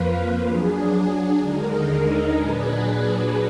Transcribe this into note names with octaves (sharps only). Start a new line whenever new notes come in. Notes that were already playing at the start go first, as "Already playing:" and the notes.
Already playing: F2 F3 A#3 F4 B4
F#3 D4 G#4
D#2 D3 G#3 D#4 A#4
A#2 F#3 D4 G#4 B4